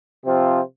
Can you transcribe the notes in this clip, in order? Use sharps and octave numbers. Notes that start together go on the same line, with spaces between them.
C3 F3 C4 F4